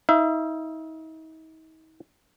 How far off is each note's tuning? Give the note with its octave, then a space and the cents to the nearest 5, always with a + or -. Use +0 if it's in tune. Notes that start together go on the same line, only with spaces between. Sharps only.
D#4 +40 E5 +40